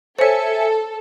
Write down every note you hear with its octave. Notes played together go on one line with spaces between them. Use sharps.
A4 C5 C#5 E5 G#5 C#7